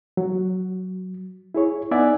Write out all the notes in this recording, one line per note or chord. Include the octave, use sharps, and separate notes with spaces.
F#3
E4 G#4 C#5
B3 D#4 D5 E5 F#5 G#5